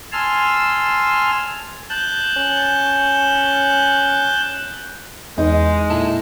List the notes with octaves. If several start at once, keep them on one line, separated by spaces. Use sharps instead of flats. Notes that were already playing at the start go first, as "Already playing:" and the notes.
G#5 A5 C6 E6 F6
A5 F#6 G6
C#4
E2 G#3 D#4
A#2 E4 A4